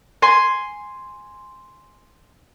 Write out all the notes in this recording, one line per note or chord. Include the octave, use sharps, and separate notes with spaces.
G#5 C6